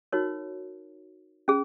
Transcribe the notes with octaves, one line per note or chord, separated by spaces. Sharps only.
D#4 F#4 A#4 C#5
C#4 G#4